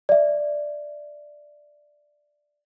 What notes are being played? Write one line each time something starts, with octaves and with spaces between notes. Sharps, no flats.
D5 E5